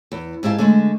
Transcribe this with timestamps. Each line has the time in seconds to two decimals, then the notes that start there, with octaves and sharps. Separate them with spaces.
0.12 E2
0.43 G#2 E4 G4 F5 A5
0.58 D3 G#3 A3